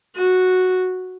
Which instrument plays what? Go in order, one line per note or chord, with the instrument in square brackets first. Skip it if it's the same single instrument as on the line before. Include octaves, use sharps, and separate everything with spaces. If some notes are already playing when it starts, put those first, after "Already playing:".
[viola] F#4